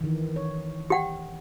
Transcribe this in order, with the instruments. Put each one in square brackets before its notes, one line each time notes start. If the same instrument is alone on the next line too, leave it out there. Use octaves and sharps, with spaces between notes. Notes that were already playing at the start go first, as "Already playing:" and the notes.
[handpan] D#3 E3
C#5
[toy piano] G4 F#5 G5